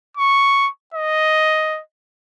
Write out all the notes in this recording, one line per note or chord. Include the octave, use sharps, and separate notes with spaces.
C#6
D#5